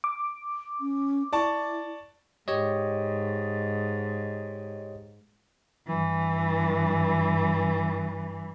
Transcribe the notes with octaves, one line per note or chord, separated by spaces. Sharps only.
D6
C#4
E4 D5 A5 C#6
G#2 G4 C#5 D#5
G2 E3